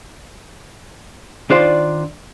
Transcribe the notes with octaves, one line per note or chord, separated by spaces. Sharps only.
D#3 D4 F4 C5 D5